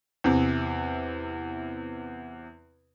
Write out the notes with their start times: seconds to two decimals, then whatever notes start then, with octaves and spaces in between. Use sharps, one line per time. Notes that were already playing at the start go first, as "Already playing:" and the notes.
0.24 E2 C3